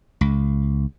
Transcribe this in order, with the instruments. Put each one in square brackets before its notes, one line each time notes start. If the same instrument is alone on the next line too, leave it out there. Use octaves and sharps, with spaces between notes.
[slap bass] C#2